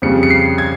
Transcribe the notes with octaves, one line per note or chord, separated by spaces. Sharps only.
F2 C#3 G3 C#7
C#7
C7
G#6